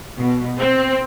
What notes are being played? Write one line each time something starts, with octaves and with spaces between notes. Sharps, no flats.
B2
C4